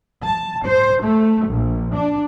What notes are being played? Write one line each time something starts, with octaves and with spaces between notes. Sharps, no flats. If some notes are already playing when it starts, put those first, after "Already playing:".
A5
C5
A3
A#1
D4